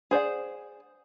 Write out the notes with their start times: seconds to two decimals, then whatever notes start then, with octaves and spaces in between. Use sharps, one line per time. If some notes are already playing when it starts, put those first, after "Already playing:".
0.11 G#4 C5 D5 F#5